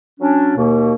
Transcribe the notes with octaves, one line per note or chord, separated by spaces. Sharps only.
F#3 C#4 D4
D#2 B2 A#3